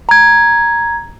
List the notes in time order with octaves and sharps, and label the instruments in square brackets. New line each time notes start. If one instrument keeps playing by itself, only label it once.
[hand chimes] A#5 G#6